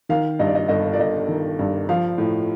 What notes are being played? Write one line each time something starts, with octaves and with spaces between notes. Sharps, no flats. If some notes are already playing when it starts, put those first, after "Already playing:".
D#3 F5
G2 D#5
D5
D#5
G1 D#5
D5
G1 D#5
D#3
G2
F3 F5
A2